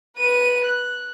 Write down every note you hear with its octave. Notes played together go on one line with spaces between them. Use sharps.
B4 D#7
F#6